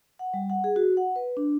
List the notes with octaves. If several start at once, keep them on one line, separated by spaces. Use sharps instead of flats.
F#5
G3
F#5
G#4
F#4
F#5
B4
D4